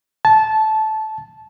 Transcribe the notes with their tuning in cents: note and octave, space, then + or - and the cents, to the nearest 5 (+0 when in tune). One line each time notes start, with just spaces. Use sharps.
A5 -15